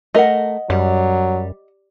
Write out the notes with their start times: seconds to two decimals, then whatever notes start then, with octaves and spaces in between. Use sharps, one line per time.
0.14 A3 A#4 D#5 F#5
0.70 F#2 F#3 G3